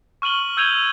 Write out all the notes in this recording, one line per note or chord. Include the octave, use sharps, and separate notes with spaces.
C#6 F6 D#7 F#7 G7
E6 G6 G#6 D#7 F7 G7